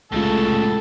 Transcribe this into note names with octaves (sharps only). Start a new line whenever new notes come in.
C2 A2 C#3 G#3 F4 A4